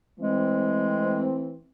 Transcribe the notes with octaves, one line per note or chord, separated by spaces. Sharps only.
E3 G#3 A3 C4